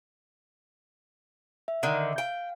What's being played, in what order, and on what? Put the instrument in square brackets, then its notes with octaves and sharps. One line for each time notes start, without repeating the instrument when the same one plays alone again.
[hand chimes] E5
[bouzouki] D3 D#3
[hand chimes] F5 [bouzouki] G5